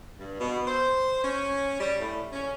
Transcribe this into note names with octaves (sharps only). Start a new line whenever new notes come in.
G2
B2
C5
C#4
G3
A2
C#4